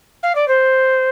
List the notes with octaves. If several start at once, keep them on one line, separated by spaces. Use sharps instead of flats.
F5
D5
C5